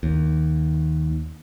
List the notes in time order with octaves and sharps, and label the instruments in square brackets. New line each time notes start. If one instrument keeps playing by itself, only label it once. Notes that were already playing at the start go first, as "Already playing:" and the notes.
[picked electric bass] D#2